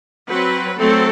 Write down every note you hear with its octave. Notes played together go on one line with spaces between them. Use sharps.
F#3 C4 B4
F#3 A3 C4 A4